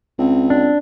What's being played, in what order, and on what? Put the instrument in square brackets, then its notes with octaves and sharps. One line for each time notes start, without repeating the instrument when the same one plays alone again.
[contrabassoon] C#2 [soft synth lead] C4
[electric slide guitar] D4